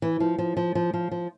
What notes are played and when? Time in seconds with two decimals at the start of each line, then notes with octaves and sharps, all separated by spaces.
0.02 E3
0.20 F3
0.38 F3
0.57 F3
0.75 F3
0.94 F3
1.11 F3